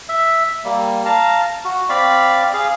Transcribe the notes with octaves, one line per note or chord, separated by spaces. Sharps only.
E5
G3 A#3
F5 A5 A#5
F#4
C4 D5 F5 B5
G#4 F5